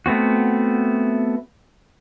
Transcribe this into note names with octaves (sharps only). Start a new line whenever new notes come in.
A3 B3 C4 F#4